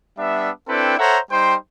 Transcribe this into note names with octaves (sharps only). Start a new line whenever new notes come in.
G3 B3 D4 E5
C4 D4 E4 A4 B4 G5
A4 C5 C#5 E5 F#5 A#5
G3 D#4 C5 G5 C6